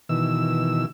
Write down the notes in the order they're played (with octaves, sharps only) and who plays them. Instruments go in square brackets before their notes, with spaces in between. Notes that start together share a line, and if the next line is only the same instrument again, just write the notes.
[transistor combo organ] B2 D#3 E3 E6